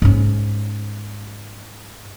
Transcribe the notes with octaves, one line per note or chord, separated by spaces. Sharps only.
G#2 C#4